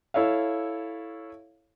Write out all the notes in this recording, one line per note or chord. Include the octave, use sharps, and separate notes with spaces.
E4 A4 C#5 E5 F5